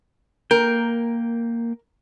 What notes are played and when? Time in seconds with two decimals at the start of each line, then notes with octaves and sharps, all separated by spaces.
0.51 A#3 A#4 G5